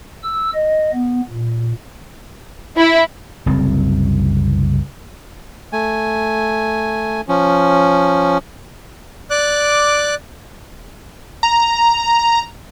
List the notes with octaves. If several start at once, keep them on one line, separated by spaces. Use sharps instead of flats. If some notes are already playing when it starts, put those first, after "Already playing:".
E6
D#5
B3
A#2
E4
F#1 C2 C#3 C4
A3 G#5
F3 C#4
D5 D6 F#6
A#5